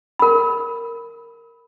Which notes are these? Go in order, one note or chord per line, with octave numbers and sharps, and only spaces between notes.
A#4 B5